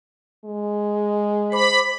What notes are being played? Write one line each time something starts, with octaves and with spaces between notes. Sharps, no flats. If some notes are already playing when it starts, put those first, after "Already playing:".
G#3
C5 B5 D6